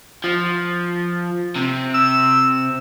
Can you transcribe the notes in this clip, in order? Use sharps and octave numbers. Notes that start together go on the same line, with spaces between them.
F3
C3
E6